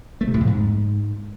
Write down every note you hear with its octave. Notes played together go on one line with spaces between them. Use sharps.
A3
C3
A2
F2
G#2